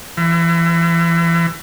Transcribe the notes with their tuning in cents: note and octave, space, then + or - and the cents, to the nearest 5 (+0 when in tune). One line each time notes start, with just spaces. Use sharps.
E3 +30